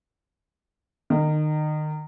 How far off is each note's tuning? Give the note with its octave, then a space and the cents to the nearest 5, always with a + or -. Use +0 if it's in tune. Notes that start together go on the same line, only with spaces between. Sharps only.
D#3 -30